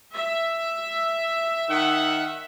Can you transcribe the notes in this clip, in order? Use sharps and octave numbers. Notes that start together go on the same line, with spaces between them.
E5
D#3 D#4 F#5